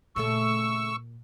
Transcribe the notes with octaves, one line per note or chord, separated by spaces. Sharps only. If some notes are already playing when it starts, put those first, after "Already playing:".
A#2 C#3 A3 A4 C#6 E6